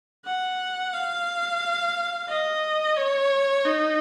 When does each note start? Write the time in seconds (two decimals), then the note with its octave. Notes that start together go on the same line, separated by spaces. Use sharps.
0.25 F#5
0.94 F5
2.28 D#5
2.96 C#5
3.65 D#4